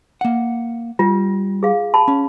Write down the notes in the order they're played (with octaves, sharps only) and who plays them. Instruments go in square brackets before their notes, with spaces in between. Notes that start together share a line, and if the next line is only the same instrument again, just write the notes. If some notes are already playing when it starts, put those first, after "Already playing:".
[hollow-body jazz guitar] A#3 F#5
[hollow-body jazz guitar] G3 [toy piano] F4
[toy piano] G#4 F5
A5 B5
[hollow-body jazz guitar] C#4